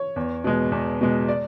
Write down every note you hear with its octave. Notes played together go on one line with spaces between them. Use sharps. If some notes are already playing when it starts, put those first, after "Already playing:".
Already playing: C#5
E2
B2 G#3
E2
B2 G#3
D5